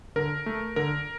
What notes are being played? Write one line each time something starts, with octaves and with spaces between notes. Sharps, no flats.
D3 A#4
A3
D3 A#4